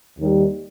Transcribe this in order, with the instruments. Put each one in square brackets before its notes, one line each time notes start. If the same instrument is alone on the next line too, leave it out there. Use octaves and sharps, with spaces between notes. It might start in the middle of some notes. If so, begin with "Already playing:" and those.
[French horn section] D#2 D#3 G3